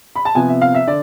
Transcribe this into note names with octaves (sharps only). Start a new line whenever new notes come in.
B5
A5
C3 F3 B3 G#5
E5
F5
E5
D3 D5